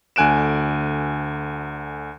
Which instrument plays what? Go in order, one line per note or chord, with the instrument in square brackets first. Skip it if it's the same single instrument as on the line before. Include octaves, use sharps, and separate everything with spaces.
[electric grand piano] D2 D3 G#5 F#6 D7 E7